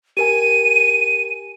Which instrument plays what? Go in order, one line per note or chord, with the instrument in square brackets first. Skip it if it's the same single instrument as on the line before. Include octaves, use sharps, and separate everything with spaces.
[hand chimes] G4 A#4 G#5 [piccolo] D#7